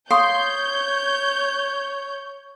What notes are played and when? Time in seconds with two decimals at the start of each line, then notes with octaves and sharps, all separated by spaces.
0.10 C#5 F5 C6 C#6 D#6 G6